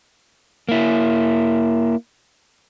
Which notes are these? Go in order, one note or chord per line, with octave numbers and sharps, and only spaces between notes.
A#3 E4